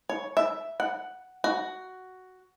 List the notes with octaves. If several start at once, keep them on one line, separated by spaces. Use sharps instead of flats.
C#5
E5
F#5
F#4